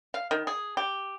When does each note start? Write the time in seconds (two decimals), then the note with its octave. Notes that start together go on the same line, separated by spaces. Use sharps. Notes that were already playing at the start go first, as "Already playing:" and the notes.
0.14 F5
0.31 D#3
0.47 G#4
0.77 G4